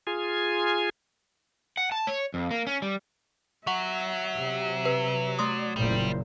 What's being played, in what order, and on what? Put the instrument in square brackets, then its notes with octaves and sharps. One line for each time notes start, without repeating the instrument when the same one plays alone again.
[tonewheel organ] F4 G#4 G#5
[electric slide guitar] F#5
A5
C#5
F2
A#3
C#4
G3
[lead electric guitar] F#3 [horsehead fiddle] E5 [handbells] F#5 C#6
[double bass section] C3
[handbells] B4
[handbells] A3 C6 D#6 [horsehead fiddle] D5
[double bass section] F#1 A#2 [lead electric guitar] G3 [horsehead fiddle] E4 C5